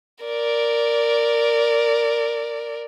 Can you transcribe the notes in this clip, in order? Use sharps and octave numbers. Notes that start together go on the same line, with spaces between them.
A#4 D5